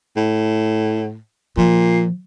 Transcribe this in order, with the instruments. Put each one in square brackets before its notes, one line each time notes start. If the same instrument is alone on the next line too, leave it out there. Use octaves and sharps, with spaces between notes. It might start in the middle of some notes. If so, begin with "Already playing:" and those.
[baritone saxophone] A2
[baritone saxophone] A#2 [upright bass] F3